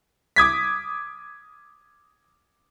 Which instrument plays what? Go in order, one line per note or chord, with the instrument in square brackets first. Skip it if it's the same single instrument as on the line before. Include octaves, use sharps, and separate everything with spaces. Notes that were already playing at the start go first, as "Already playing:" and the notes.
[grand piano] D6 D#6 G#6 B6